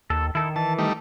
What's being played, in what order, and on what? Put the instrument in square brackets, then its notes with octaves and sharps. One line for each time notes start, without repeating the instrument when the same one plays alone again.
[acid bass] D#2 [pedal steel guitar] A4
[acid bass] D#3 [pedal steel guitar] E4 A4
[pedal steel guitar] E3 [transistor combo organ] A5
[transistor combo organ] G3 A3 D#4